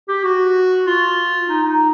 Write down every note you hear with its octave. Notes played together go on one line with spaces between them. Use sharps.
G4
F#4
F4
D#4
D#4